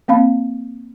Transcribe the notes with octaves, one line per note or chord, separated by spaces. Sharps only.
A#3 C4 F5 B5